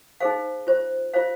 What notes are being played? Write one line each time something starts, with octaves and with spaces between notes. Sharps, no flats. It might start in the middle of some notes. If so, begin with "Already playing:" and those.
D#4 G#4 C5 F5
F4 C5
F4 C5 F5